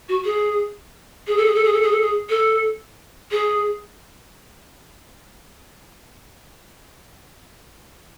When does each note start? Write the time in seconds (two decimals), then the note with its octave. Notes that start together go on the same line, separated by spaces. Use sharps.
0.08 F#4
0.24 G#4
1.26 G#4
1.36 A4
1.45 G#4
1.54 A4
1.64 G#4
1.72 A4
1.82 G#4
1.91 A4
2.00 G#4
2.29 A4
3.30 G#4